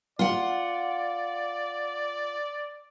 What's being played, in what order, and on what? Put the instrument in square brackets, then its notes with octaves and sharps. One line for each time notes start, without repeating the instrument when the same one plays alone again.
[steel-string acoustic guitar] F4 F#5 [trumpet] D5